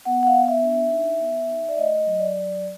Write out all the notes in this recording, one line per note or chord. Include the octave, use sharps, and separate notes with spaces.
B3 F#5
F#5
F5
B3
E5
D4
E5
D#4
B3
D#4
D5
A3 D#5
F#3
D5
F#3